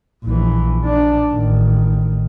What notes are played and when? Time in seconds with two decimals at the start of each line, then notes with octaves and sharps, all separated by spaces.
0.24 A#1 E3
0.84 D4
1.32 A1 D#3